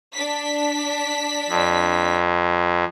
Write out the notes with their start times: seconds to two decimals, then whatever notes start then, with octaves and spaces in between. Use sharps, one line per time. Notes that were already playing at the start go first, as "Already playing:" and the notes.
0.13 D4 B6
1.49 F2